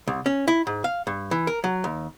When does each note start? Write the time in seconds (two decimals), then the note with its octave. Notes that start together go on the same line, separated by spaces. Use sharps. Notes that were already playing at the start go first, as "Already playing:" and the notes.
0.08 C2
0.26 C#4
0.48 E4
0.67 G#2
0.84 F5
1.07 G2
1.31 E3
1.47 A#4
1.64 F#3
1.84 D#2